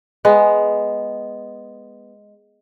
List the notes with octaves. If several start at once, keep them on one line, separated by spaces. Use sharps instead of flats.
G#3 B3